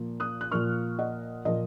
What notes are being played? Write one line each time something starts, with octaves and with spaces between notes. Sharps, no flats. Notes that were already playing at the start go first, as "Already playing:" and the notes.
Already playing: A#2 F3 A#3
D#6 F#6
F#6
A#2 F3 A#3 C#6 F6
D#5 F#5
A#2 F3 A#3 D#5